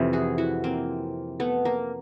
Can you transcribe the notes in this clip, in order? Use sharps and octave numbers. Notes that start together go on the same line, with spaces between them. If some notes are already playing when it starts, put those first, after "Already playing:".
Already playing: F2 C3 E3
F#4 G#4
E4 F#4
A#3 C4
A3 B3
A#3